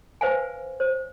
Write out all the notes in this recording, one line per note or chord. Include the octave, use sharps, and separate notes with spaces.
B4 C5 F5 F#5 G#5
C5